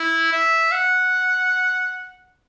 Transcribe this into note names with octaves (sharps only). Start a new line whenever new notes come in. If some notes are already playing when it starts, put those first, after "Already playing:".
Already playing: E4
E5
F#5